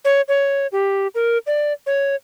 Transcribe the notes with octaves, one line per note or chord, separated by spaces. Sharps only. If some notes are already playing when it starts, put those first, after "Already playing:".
C#5
C#5
G4
A#4
D5
C#5